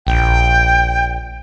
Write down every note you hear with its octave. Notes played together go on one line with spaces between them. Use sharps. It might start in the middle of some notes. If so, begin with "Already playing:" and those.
A#1 G5